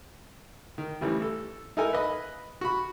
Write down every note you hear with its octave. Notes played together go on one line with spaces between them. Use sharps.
D#3
A1 E3 G3
A4
D#4 E4 A4 A#4 G#5
B4 D#5 B5
F#4 B5